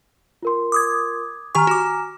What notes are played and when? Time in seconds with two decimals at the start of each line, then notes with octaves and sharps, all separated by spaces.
0.43 F4 A#4 C6
0.72 D6 D#6 G#6
1.55 D#3 G4 G#5 A#5 C#6 F6
1.67 F#4 D6